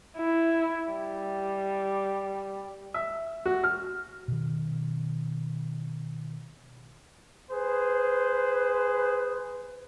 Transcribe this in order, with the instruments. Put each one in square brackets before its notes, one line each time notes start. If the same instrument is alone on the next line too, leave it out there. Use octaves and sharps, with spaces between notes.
[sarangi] E4
G3
[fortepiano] E5
F#4
F6
[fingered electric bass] B2 D#3
[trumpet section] G#4 B4 C5